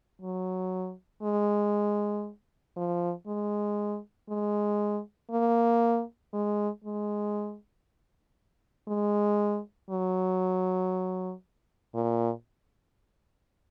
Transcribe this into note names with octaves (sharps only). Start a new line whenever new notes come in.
F#3
G#3
F3
G#3
G#3
A#3
G#3
G#3
G#3
F#3
A#2